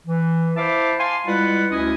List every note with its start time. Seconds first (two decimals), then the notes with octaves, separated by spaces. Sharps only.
0.06 E3
0.57 E4 C5 E5 F5 A5 D6
0.99 F5 G#5 A5 C6
1.27 G3 G#3 E4 F4 B4 F#5
1.71 D2 C#4 E4 D#5 G#5 D#6